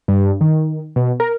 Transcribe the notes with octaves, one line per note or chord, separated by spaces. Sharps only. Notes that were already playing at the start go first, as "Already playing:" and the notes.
G2
D#3
B2
A#4